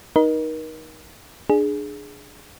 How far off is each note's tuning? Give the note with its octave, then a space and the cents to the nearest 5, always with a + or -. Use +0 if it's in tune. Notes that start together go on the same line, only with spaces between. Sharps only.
D#4 +0 A#4 +35 D#5 +0
D4 +20 G#4 +5